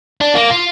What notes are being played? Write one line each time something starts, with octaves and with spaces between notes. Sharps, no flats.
D4
A#3
F4